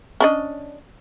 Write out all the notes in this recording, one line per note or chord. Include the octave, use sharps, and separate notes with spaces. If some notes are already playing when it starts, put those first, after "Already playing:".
C#4 D4 D#5